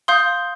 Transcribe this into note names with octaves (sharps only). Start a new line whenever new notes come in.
F5 C6 D#6 G6